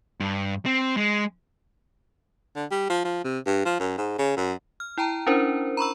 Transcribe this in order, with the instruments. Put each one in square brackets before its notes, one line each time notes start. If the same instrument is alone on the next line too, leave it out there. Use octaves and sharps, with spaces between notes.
[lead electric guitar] G2
C4
G#3
[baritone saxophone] D3
G3
F3
F3
C3
G2
F3
F#2
G#2
C#3
F#2
[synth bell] F6
E4 G5 A5 A#5
C#4 D4 E4 A#4 C5
A#5 B5 C#6 E6